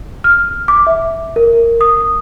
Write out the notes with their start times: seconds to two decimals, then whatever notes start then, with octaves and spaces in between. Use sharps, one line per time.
0.24 F6
0.68 D6
0.87 E5
1.36 A#4
1.81 D#6